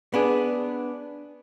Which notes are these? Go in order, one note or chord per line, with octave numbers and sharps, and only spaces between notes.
B3 D4 G#4